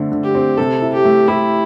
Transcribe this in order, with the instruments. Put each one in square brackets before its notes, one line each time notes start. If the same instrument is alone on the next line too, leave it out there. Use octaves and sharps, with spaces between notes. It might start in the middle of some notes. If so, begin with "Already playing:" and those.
Already playing: [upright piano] D3 A3 C4
D3
[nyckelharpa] G4
[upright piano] C4
[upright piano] C3 [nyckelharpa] A4
[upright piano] E4
[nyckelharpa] G4
[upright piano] A3
[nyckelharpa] E4 [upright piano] G4